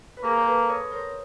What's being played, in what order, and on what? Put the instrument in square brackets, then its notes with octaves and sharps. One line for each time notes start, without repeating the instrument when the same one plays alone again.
[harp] B4
[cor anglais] A#3 [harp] G#4 A#4
[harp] C5
A4 B4
C#5 D#5
A#4 C5